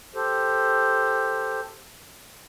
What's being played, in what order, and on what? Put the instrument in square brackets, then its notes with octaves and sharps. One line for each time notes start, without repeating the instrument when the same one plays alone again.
[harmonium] G4 A4 C5